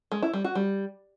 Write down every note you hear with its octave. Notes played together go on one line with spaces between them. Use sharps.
G#3
E4
G3
F#4
G3